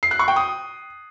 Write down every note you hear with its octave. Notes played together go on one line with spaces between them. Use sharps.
C7
F#6
C#6
G5
D#6